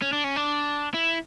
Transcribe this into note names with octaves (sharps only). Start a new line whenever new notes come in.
C#4
D4
C#4
D4
E4